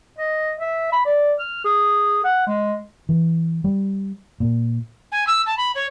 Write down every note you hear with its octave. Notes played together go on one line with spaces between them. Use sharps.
D#5
E5
B5
D5
F6
G#4
F#5
G#3
E3
G3
A#2
G#5
E6
A5
B5
C#5